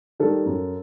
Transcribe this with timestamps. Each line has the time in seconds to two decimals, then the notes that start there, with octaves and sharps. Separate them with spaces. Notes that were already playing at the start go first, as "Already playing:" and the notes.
0.20 D#3 G3 A4
0.46 F#2